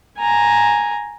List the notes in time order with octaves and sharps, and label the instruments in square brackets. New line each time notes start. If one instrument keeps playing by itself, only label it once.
[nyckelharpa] G#5 A#5